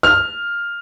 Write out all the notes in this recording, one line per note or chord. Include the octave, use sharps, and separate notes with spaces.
F6